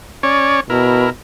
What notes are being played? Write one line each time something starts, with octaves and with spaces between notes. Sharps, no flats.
C#4 C#5 D5
B2 E4 A#4